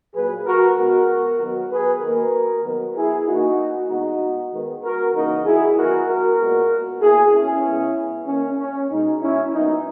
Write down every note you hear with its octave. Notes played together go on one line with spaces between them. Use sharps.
A#2 F#3 A#3 G#4 B4
F#4 A#4
B2 G#3 B3 F#4 A#4
D#3 F#3 B3
G#4 B4
D#3 A#3 F#4 A#4
D#3 F#3 B3
E4 G#4
D#3 A#3 D#4 F#4
B2 G#3 B3 D#4 F#4
D#3 G#3 B3
F#4 A#4
C#3 E3 A#3 D#4 F#4
E4 G#4
D#3 F#3 B3 F#4 A#4
F#4 A#4
A#2 G#3 B3
B2 A#3 E4 G#4
C#4 E4
C#3 G#3 B3
D#3 A#3 C#4
C#4
B2 G#3 B3 D#4
C#4 E4
A#2 F#3 B3 D#4